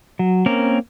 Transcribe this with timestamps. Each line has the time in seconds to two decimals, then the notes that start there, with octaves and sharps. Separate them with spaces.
0.19 F#3
0.46 A#3 C4 C#4 A#4